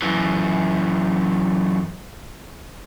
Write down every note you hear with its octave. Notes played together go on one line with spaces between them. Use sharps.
F#2 E3